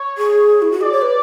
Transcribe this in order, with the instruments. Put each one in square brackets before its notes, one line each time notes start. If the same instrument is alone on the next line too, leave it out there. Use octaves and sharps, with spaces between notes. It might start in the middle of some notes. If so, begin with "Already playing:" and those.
Already playing: [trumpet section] C#5
[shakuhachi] G#4
E4
F#4
[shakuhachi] G#4 [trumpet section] D5
[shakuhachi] C#5
B4